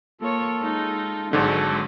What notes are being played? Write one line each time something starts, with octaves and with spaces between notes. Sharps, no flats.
A#3 F4 A4 C#5
G#3 D#4
G#1 G#2 D3 F#3 G#3 A4 C#6